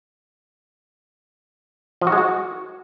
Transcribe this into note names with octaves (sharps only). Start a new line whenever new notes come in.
F3
F#4
G#3
F#4